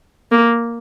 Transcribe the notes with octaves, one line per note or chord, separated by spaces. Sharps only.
A#3